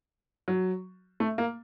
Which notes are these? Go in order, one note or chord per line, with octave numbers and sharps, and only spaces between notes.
F#3
A3
A#3